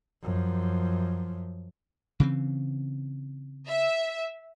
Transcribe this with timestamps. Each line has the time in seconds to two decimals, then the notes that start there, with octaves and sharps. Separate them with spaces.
0.23 F#2 F3
2.20 C#3 E3 C4
3.69 E5